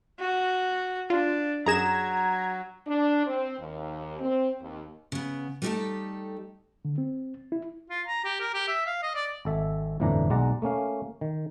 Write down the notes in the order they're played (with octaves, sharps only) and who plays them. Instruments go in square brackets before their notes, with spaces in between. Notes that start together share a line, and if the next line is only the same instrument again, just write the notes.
[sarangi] F#4
[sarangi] D4 [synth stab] F4
[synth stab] F#2 G#4 E7 [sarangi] F#3 [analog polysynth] A#5 G#6
[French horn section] D4
C4
D#2
C4
D#2
[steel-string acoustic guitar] C#3 B3
G3 A3 B3 D#4 G4 A4
[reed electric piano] D3
C4
E4
[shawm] F4
A#5
G4
A#4
G4
E5
F5
D#5
D5
[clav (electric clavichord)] G#1 A4 E5
G1 F2 A2 E3 D4 A#5
B1 G#3 D5 F#5 A#5
A3 A#3 C#4 F5
D#3